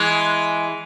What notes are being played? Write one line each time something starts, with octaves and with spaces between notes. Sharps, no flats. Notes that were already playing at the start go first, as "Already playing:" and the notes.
Already playing: E3 G#3